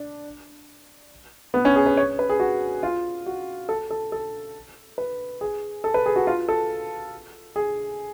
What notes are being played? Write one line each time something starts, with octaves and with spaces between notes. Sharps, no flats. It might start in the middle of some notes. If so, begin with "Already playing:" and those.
Already playing: D4
B3
C#4
G#4
B4
C#5
B4
G#4
F#4
F4
F#4
A4
A4
A4
B4
G#4
A4
B4
G#4
F#4
F4
A4
G#4